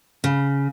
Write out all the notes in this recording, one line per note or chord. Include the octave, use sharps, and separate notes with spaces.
C#3